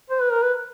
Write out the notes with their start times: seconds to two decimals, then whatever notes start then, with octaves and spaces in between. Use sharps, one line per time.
0.10 C5
0.21 B4
0.32 A#4
0.43 B4